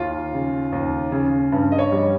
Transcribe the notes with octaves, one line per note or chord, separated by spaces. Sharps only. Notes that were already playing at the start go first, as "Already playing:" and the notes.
Already playing: D#2 F4
C#3
D#2
C#3
G2
D#5
C#5
G3